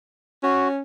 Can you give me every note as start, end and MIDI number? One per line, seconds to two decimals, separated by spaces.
0.43 0.81 61
0.43 0.68 66